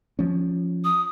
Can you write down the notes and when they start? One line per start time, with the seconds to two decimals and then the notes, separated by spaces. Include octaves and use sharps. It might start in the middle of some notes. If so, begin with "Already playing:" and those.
0.19 F3 C#4
0.84 D#6